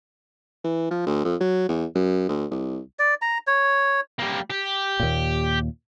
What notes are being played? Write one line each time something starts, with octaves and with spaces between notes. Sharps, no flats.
E3
F3
D2
F2
F#3
E2
F#2
D2
C2
D5
A#5
C#5
G3 A#3
G4
D#2 A#2